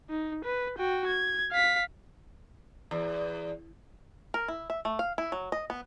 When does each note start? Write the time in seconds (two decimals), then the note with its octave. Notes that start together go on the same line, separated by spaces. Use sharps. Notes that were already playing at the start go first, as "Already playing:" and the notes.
0.10 D#4
0.44 B4
0.78 F#4 G5
1.07 G#6
1.52 F5 B6
2.91 E2
4.34 A#4
4.48 E4
4.70 E5
4.85 A3
4.99 F5
5.18 E4
5.32 F#3
5.52 D#5
5.70 B3